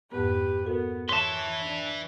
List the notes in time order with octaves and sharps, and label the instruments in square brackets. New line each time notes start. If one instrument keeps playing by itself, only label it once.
[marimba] F2 G#2 B3 [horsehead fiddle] G4 B4
[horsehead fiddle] B3 [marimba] F#4 A4 A#4
[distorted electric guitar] B4 E5 [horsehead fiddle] C#5 [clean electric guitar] A5 C6
[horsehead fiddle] D4